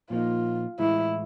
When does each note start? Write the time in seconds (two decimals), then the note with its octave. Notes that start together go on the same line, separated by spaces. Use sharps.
0.10 A#2 F3 A#3 D#4 F4
0.79 A2 E3 G#3 E4